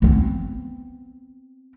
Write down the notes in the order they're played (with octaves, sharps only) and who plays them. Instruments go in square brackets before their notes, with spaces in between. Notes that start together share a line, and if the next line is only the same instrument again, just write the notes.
[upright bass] B3 C4